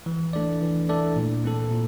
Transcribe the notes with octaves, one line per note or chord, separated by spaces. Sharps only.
E3
A3 D4 A4 D5
E3
A3 D4 A4 D5
A#2
A3 C4 E4 A4
A#2